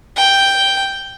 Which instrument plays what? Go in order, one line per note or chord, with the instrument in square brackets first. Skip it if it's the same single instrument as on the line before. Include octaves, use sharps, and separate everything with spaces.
[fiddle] G5